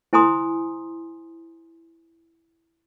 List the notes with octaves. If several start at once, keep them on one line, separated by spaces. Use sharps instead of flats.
E4 C5 G#5 A#5 C6 D#6